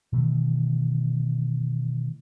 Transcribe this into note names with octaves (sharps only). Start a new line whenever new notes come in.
B2 D#3 E3 A3